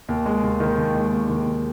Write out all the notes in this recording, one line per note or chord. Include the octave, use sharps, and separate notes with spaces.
D#2
G#3
D#2
D#3
D#2
G#3
D#2
D#3
D#2